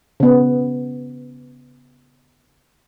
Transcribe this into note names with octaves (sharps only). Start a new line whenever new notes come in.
C#3 B3